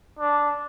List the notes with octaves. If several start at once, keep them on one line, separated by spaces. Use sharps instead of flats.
D4